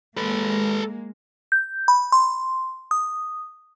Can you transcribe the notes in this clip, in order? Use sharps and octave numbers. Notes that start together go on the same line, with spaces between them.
G#3 A#3 A4 B4
G6
B5
C6
D#6